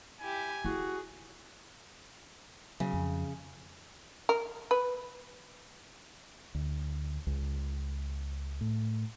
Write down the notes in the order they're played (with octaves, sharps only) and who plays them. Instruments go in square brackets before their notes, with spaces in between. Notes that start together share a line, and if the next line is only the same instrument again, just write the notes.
[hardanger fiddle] E4 G4 [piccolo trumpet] G#5
[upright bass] E4 [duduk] F#4 [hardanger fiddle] G#4
[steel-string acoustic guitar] C#3 [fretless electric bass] F#3
[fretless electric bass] F2
[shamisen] A#4
B4
[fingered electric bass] D2
C#2
A2